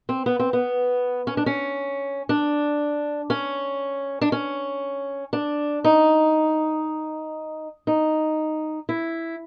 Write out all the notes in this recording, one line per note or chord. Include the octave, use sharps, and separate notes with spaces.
C4
B3
C4
B3
C#4
D4
C#4
D4
C#4
D4
C#4
D4
D#4
D#4
E4